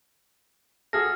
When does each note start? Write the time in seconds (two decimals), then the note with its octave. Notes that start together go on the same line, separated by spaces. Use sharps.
0.93 F#4 G#4 A4 F6 A#6